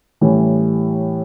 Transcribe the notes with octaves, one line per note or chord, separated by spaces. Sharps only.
A2 E3 G3 C#4